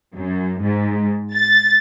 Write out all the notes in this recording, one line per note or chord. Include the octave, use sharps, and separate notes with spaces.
F#2
G#2
A6